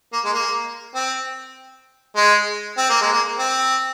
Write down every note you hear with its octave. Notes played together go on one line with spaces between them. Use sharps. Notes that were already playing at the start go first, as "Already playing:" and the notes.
A#3
G#3
A#3
C4
G#3
C4
A#3
G#3
A#3
C4